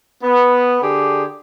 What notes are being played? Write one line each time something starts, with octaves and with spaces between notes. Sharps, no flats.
B3
D3 G4 G#4